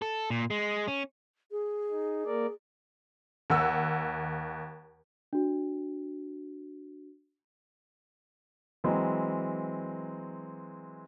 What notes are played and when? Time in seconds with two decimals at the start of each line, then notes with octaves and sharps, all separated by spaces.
0.02 A4
0.30 A#2
0.50 G#3
0.88 C#4
1.51 G#4
1.90 D#4
2.26 A#3 A#4 D5
3.50 D#2 F#5 E6
5.33 D4 F#4
8.84 E3 F#3 G#3 C4